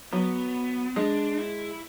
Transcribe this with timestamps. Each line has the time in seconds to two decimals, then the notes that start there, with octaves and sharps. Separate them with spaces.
0.13 F#3 B3
0.96 G#3 D4
1.38 E4